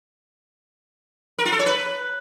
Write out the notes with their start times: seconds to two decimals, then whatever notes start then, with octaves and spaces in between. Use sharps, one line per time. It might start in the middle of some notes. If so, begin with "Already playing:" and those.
1.38 A#4
1.45 F4
1.52 A4
1.59 C#5
1.66 B4